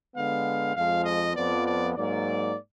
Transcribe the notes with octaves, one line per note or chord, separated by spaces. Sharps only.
D3 G#3 B3 F5
F2 F3 G#3 F5
D#5
F2 F3 B3 D5
D5
G#2 F#3 A#3 D5